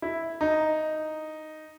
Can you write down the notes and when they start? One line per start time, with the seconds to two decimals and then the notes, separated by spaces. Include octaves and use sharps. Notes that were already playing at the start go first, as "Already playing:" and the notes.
0.02 E4
0.41 D#4